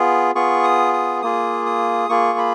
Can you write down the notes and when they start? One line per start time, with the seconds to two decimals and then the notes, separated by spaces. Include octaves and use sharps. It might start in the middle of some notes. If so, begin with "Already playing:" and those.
Already playing: B3 F4 G#4
0.35 B3 F4 G#4 C#6
0.64 D#6
0.93 D#6
1.22 A#3 F4 G#4 D#6
1.66 D#6
2.09 A#3 F4 G#4 C#6
2.38 B5